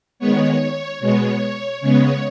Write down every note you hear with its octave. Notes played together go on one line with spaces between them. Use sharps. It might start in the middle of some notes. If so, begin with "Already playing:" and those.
D#3 G#3 B3 C#5
B2 G#3 B3 C#5
C#3 G#3 B3 C#5